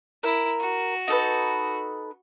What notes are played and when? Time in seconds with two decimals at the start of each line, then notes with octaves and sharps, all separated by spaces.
0.23 E4 A#4
0.60 F#4
1.08 D#4 A4 B4